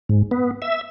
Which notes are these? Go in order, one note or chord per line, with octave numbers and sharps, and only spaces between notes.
G#2
B3
E5